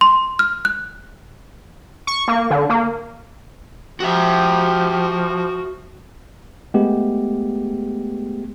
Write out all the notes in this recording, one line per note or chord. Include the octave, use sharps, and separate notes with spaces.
C6
F6
F#6
C#6
A#3
D3
A#3
F3 F#4 G4 E5
G#3 A3 B3 G4